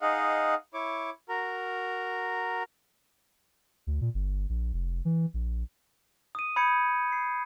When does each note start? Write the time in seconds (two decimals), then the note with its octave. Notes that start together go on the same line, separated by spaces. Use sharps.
0.01 D#4 G#4 D#5 F5 F#5
0.74 E4 C#5 D6
1.29 F#4 A#4 A#5
3.87 D2
4.01 A#2
4.14 G1
4.49 A#1
4.73 F1
5.05 E3
5.34 A#1
6.35 D#6 D#7
6.56 B5 D#6 G6 G#6 C#7
7.12 C7